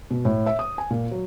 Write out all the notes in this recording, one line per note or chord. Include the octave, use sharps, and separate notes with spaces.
B2
A2
E5
D#6
G#5
A#2
F#3